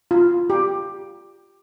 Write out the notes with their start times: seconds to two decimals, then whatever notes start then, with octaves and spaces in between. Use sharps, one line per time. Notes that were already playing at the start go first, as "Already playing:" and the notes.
0.11 F4
0.50 G4